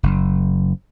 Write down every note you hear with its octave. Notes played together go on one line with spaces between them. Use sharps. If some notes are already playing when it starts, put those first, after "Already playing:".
F#1